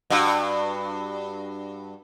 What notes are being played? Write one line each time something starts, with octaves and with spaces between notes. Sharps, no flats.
G2 F#4